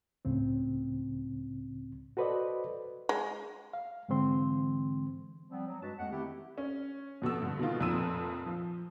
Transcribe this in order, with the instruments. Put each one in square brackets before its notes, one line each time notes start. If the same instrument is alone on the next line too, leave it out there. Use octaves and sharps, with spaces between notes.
[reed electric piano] C#2 A2 C#3 C4
F#4 A4 B4 C5 D5 D#5
[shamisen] G#3
[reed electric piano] F5
G#2 D3 E3 G#3 C4 C6
[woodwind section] F3 G3 B3 C4
F#3
G2 G#3 D4 F#4 B4 A5
F2 G#3 A3 B3 C#4 F#5
D#3 A3 C4 E4 G4
[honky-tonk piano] C#4
F2 B2 A4 E6
G2 D3
B2 D#3 F4
F1 F2 A#2 E6 D#7
F3